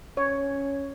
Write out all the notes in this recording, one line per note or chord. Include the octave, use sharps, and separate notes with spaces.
C#4 C#5